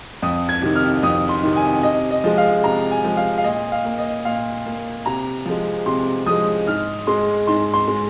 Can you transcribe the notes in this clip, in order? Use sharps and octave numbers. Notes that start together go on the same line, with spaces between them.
F2 D#6
G#6
C3 D#3
F6
F2 D#6
C6
C3 D#3
G#5
C3 D#5
D#5
F3 G#3
F5
C3 A#5
G#5
F3 G#3
F5
F5
A#2 D#5
F5
A#3
D#5
A#2 F5
A#3
C3 A#5
F3 G#3
C3 C6
F3 G#3 D#6
G#2 F6
G#3 C6
G#2 C6
C6
G#3